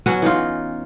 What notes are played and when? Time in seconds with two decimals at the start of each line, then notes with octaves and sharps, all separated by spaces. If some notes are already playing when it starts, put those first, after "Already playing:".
0.06 F#3 B3 C#4 F#4
0.22 E3 D#4 F4